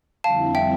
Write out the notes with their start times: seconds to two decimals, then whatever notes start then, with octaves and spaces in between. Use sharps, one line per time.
0.24 F2 D3 G3 C4 E4 F5 A5
0.55 E5 G5